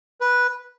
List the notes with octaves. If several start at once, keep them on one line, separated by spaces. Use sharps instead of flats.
B4